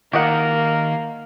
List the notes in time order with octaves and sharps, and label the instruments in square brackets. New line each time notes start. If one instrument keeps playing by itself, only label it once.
[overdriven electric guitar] D#3 [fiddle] A#3 [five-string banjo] G4 D#5 F#5 [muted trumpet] A#4